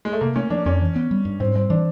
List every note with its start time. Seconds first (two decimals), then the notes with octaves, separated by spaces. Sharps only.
0.05 G#3
0.13 A3
0.21 C3 A#3
0.36 A3 C#4
0.50 F3 D4
0.66 F2 C#4
0.81 E3
0.96 B3
1.11 G3
1.25 G2
1.40 G#2 C4
1.56 G3 C4
1.70 E3 D4